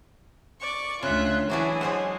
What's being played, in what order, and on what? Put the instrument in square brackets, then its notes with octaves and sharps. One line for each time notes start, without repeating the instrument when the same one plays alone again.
[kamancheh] D5 [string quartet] C#6
[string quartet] D2 F4 [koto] C#3 [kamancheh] E5 F#6
[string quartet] E3 G#4 [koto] F#3 D4 F#4 [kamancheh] E4
[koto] F#3 C5 F#5 [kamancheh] G#3